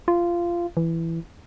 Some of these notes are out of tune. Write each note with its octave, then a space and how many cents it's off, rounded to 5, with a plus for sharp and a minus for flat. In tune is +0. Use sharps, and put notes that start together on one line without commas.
F4 -15
E3 +5